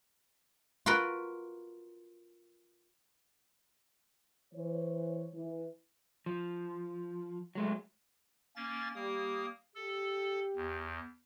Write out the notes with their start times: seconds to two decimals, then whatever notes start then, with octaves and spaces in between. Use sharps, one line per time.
0.86 F4 F#4 A#4 B4
4.54 E3 C5 C#5
5.33 E3
6.26 F3
7.55 F#3 G#3 A3
8.56 A#3 C#4 A6
8.95 G3 A#3 D#6
9.75 G4 A4
10.56 E2